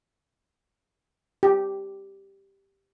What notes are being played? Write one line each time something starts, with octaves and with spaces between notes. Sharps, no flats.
G4